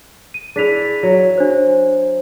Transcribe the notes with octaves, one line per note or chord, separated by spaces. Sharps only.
D#7
D4 E4 G#4 B6 F7
F#3
D4 C5